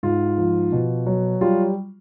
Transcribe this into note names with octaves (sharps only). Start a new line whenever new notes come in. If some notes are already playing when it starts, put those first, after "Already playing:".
G#2 F4
F3
B2
F#3
G3 F4